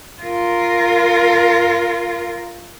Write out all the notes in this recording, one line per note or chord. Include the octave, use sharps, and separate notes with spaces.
F4 A#4